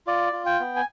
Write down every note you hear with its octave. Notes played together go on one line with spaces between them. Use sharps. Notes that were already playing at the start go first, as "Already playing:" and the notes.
F4 D5
F4
G5
B3
G#5